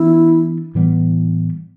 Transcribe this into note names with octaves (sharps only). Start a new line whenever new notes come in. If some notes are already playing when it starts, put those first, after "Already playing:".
Already playing: E3 B3 D4 E4
A2 E3 G3 B3